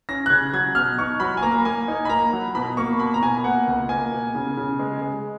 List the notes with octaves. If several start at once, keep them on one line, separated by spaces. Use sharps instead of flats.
C#4 A#6
F#6
C#3 G#6
F#3 G#6
B2 F6
D#4 C#6
F#3 B5
G#5
A#3 A#5
A#3 G#5
D#4
B5
A#3 A#5
F#3
B2 B5
A#3 C#6
B2 B5
A#5
B2 G#5
A#3 F#5
C#2
A#3 G#5
B2
C#3
C#3
G#3
G#3